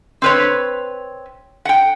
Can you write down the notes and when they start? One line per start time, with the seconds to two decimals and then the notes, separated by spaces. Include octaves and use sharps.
0.22 C4 B4 C#5
1.65 F#5 G5